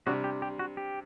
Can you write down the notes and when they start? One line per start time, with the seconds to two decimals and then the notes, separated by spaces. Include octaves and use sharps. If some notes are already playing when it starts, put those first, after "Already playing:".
0.06 C3 G3 D4 F#4
0.24 G4
0.42 G4
0.59 F#4
0.77 G4